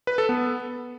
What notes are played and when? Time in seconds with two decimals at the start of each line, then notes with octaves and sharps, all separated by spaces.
0.07 B4
0.18 A4
0.29 B3